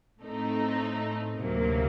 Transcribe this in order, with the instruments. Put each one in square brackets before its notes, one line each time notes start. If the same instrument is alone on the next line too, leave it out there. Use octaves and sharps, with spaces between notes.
[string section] A2 A3 C4 D#4
D2 C3 F#3 A#3